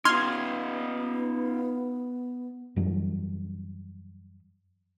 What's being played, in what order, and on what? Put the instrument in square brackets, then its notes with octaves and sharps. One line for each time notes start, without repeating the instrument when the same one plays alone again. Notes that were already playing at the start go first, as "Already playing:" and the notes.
[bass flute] B3 [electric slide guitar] D#4 F4 [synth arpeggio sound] C6 F6 G#6
[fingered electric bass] F#2 E3 F#3 G3